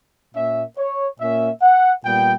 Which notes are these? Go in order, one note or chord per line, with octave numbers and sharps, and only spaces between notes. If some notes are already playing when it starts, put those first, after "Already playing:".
A#2 A#3 C#4 E5
C#5
A#2 A#3 C#4 E5
F#5
A#2 G3 B3 G5